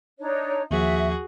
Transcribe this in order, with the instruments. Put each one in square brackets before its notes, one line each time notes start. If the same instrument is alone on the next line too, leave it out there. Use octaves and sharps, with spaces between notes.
[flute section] D4 D#4 C#5
[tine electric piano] D#2 F3 [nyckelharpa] F#4 G#4 [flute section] E5